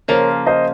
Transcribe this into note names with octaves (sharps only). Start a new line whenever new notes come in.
C#3 F3 A#3 F4 A#4 C#5
C5 D#5